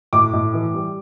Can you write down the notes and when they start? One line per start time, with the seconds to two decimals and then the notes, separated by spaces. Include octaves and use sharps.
0.13 A2 D6
0.33 A2
0.54 E3
0.74 G3